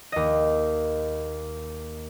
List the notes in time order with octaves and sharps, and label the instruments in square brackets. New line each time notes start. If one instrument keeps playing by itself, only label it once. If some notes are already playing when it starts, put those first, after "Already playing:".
[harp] D#2 D#5